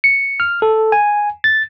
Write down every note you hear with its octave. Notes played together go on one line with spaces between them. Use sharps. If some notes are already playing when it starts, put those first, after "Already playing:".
C#7
F6
A4
G#5
A6